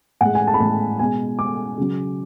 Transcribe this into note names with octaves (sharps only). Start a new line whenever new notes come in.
A2 G#3 F#5
G#5
A5
B5
A2 G#3 A5
B2 G#3 G#5
B2 G#3 D6
C#3 F#3